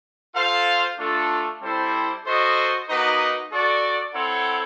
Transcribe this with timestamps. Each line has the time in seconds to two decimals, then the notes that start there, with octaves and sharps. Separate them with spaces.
0.34 F4 A4 C5 F5
0.98 A3 D4 F4 A4
1.62 G3 C4 E4 A4 C5
2.25 F#4 A4 C5 D#5
2.88 A#3 D#4 F#4 B4 D#5
3.51 F#4 A4 D5
4.14 C4 E4 A4 C#5 F#5